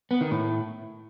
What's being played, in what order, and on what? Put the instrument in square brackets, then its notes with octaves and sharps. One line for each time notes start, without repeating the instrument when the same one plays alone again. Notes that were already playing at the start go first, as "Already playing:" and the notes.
[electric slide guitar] B3
D#3
A2